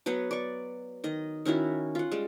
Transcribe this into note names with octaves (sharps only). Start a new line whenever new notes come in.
F#3 B3 B4 F#5
D5 C#6
D#3 D#5
D#3 C#4 E4 F#4
F4 F#5
G3 G#3